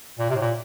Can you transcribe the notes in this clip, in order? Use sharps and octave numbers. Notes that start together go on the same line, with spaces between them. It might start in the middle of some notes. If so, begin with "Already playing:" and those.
A#2
C3
A2
A#2